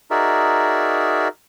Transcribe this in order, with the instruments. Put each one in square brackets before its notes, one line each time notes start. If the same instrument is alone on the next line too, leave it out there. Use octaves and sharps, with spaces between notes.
[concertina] D#4 F#4 G#4 A#4 D5 E5